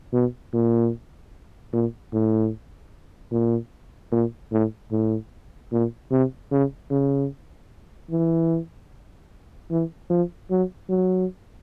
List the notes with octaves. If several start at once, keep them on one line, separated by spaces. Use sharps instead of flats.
B2
A#2
A#2
A2
A#2
A#2
A2
A2
A#2
C3
C#3
C#3
E3
E3
F3
F#3
F#3